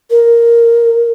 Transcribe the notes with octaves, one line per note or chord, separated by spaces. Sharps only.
A#4